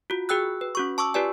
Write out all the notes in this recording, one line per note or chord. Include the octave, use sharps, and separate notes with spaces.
F4 F#4
F#4 G#4 G5 E6 F#6
B4
C#4 F#4 C#6
A5 C#6 D6 E6
F4 G4 B4 D5 G#5